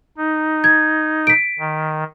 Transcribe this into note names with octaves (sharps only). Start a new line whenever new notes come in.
D#4
G#6
B6 D7
D#3